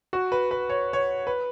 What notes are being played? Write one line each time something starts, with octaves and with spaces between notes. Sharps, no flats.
F#4
B4
B4
C#5
C#5
B4